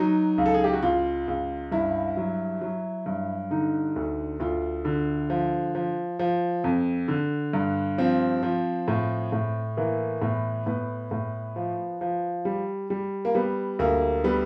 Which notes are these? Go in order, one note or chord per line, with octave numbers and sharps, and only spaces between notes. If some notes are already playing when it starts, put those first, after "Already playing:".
Already playing: F#3 D#4
C#2
A4
G#4
G4
F#4
C#2 F4
C#2
G2 E4
F#3
F#3
G2
D3 D#4
D2
D2 F4
D3
F3
F3
F3
F2
D3
G2
F3 C4
F3
A2
A2
E3 A#3
A2 B3
A2 B3
A2
F3
F3
G3
G3
A#3
G3 B3
D2 A#3
G3 B3